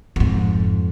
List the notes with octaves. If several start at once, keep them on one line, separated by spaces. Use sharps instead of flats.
F2 G#2